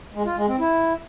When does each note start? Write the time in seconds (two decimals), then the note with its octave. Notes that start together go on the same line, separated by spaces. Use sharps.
0.14 G#3
0.26 F4
0.37 G#3
0.48 C4
0.59 E4